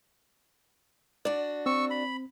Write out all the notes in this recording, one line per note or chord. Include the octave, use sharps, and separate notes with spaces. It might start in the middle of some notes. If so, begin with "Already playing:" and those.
D4 F#4 D5
C4 C#6 E6
B5